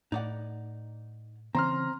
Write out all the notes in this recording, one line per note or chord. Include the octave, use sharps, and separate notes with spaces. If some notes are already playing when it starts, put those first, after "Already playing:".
A2 D#4 D5 F#5
C#3 E3 C4 C#4 A#5 C6 F6